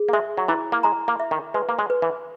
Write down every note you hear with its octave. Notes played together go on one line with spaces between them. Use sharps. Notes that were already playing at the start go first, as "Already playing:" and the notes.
Already playing: G#4
A#3
G#3 E5
F#3
E3 E4
A#3
G#3 A#5
A#3
E5
D#3
G#3 B4
A#3
G#3
B4
E3